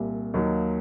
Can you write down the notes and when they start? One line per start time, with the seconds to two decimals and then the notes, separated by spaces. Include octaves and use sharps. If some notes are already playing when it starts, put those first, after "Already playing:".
Already playing: C2 A#2 G3
0.34 D#2 D#3 F#3 A#3